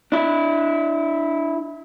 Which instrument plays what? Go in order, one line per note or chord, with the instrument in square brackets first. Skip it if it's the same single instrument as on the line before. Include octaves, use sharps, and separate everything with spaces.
[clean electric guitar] D4 E4